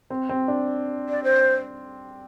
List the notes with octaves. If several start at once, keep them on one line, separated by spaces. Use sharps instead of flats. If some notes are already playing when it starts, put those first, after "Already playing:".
C4
C4
D4
D5
C5